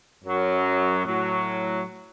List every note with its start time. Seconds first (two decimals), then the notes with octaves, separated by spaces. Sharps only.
0.24 F#2 F#3
1.03 A2 F#3